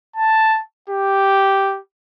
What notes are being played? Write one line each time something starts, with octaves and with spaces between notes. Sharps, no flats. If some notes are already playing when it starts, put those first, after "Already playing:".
A5
G4